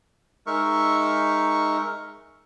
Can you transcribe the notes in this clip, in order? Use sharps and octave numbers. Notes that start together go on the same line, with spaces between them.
G#3 D#4 A#4 E5 C#6